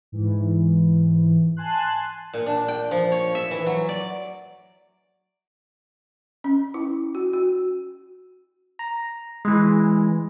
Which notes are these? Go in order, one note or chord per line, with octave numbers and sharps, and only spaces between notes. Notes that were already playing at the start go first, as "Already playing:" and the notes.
G#2 E3
G#5 A5 C6 F#6
A#2
D4
G5
F3
C#5
E5
E3
F#3
D5
C#4
E4
F#4
F#4
A#5
E3 G#3